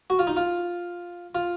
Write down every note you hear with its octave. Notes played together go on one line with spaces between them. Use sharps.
F#4
F4
D#4
F4
F4